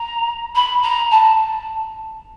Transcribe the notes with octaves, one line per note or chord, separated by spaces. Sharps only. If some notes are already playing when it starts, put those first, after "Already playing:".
Already playing: A#5
B5
A#5
A5